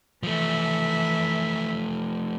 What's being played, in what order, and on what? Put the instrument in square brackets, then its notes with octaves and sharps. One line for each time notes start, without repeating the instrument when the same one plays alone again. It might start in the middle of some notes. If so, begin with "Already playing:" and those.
[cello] E3 E5 [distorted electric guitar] F3 A3